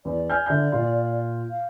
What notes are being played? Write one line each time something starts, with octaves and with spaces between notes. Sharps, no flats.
E2 D5
G#5 F6 G6
D3 D5 E5 G6
A#2 F4 C6
F5